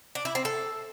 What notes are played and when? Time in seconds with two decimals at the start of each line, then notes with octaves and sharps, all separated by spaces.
0.15 D4
0.25 E4
0.35 C4
0.45 A4